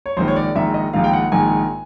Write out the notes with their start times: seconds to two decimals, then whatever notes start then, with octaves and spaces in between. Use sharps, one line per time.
0.06 C#5
0.17 A#1 G#2 D#3 C5
0.28 C#5
0.36 D5
0.55 A#1 G#2 D#3 E5
0.74 D#5
0.93 A#1 G#2 D#3 F5
1.04 G5
1.13 F#5
1.32 A#1 G#2 D#3 G#5